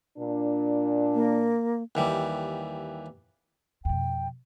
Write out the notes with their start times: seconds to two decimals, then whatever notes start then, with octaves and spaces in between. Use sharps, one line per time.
0.18 A#2 D4
1.14 A#3
1.95 D#2 E3 G3
3.85 F2 B2 G5